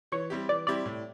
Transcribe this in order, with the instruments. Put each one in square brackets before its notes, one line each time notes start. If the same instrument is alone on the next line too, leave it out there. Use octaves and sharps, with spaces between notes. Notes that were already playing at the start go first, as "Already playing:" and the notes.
[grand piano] E3 [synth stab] C#5
[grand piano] G3 C4 E4 G4
[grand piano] E3 [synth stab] D5
[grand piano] G3 C4 E4 G4 [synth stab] D5
[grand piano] A2